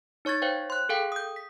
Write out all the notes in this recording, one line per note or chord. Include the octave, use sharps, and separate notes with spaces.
D#4 C#5 C#6 G#6 A6
C5 C#5 F5 G5
C6 F#6
G#4 A4 F5 G5
D#6 G6
B6